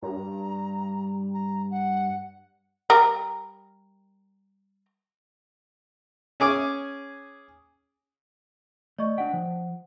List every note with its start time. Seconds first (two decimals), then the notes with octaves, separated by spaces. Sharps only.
0.02 G2 A#5
1.34 A#5
1.71 F#5
2.90 G3 A#4
6.40 C#4 G#4 D6
8.99 A3 D5 D#5 C#6
9.18 D4 F#5 G5
9.33 F3